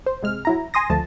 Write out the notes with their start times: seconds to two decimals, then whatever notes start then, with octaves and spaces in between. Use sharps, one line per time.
0.06 C5
0.23 C3 G#3 F6
0.45 F#3 E4 A#5
0.74 G#5 C6 D#6 A#6
0.90 G#1 D2 F3 A3 A5